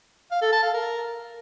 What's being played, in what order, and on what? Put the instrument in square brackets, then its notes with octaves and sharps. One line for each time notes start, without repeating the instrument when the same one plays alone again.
[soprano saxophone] F5
A4
A5
F5
A#4